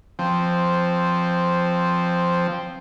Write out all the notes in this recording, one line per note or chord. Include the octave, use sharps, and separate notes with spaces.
F3 C4